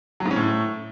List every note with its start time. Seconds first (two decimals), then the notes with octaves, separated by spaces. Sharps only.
0.20 F#3
0.26 G#2
0.31 C#4
0.36 A2